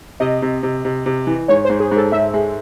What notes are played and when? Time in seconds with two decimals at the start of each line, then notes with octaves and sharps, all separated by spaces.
0.20 C3 D#5
0.42 C3
0.63 C3
0.85 C3
1.06 C3
1.27 E3
1.48 G#2 C#5
1.65 G#2 C5
1.80 G#4
1.91 G#2
1.97 A4
2.12 G#2 E5
2.34 G#3